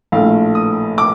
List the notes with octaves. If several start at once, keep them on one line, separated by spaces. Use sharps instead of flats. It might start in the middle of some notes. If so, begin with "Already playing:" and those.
A#1 A2 A3 F5
D#6
D6